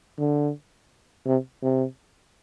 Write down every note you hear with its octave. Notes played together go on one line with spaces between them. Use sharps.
D3
C3
C3